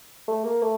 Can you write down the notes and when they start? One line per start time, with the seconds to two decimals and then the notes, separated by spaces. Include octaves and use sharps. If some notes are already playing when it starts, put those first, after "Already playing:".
0.28 A3
0.44 A#3
0.62 A3